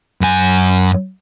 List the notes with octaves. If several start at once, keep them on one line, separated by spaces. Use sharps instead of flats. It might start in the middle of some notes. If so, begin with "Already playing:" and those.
F#2 G#5